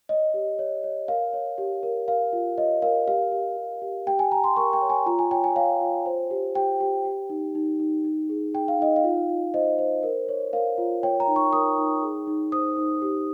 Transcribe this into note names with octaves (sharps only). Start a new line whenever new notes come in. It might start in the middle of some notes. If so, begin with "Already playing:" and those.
C#5 D#5
G4
C#5
C#5
A#4 F5
C#5
G4
A#4
A#4 F5
F4
C#5 D#5
A#4 F5
G4 F5
G4
G4
G4
G4 G5
G#5
G4 A#5
C6
A#4 C#6
G5
C#5
G#5
F4 A#5
G#5
C#5 G5
G#5
C#5 F5
F4
C5
G4
G4 G5
G4
G4
D#4
D#4
D#4
D#4
G#4
G#4 G5
F5
D#4 D#5
F5
F4
F4
C5 D#5
C5
A#4
C#5
A#4 F5
F4
C#5 G5
A#5
D#4
C#6
A#4 D#6
D#4
G#4
D#4
C5 D#6
D#4
G4